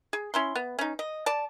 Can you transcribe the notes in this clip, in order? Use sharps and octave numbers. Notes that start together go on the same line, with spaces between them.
G#4
C#4 E4 C6
B3
C#4 D#4
D#5
D5 A5